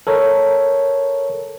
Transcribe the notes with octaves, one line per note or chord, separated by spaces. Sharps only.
A4 A#4 C#5